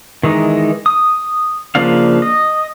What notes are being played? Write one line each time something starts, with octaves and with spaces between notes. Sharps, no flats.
D#3 E3 G#3 D#4
D#6
C#3 F3 A#3 D4 F5
D#5